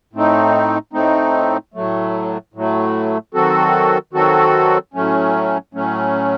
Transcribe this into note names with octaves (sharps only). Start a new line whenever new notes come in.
A2 A3 C4 D#4
A2 A3 C4 D#4
A2 F#3 A3
A2 F#3 A3
D#3 F#3 C4 F#4 A4
D#3 F#3 C4 F#4 A4
A2 F#3 A3 C#4
A2 F#3 A3 C#4